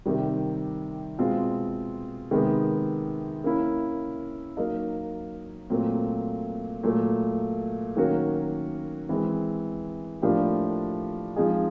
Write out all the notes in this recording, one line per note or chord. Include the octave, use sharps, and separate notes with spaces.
C3 D#3 G3
B2 G#3 C4 F4
C3 D#3 G#3 B3
A#3 C#4 E4
F#3 A#3 D#4
A#2 F#3 A3 C4
A#2 F#3 A3
D#3 F#3 A#3 C#4 F#4
E3 G#3 C4
A2 F3 A#3 D4 G4
F3 G#3 C4 D#4 G#4